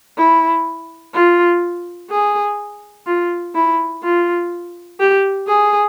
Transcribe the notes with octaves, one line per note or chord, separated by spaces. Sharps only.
E4
F4
G#4
F4
E4
F4
G4
G#4